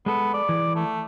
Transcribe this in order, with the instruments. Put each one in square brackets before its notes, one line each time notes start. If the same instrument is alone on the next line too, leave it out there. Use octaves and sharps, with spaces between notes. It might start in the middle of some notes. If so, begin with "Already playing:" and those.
[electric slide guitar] G#3 A4 [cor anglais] B3
[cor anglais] D5
[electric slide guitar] E3
[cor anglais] A3